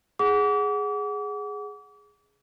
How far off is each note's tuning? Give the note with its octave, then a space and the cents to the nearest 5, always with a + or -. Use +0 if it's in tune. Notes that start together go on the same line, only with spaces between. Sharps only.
G#4 +0 F#5 +0 D6 -40